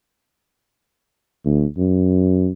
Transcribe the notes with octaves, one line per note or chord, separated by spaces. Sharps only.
D2
F#2